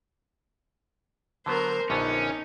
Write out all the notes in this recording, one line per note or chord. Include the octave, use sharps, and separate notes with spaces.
D3 F#3 B3 A#4 C5
A#1 D3 B3 C#4 D#4